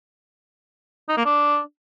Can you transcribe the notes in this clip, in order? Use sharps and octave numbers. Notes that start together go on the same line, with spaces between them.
D#4
A#3
D4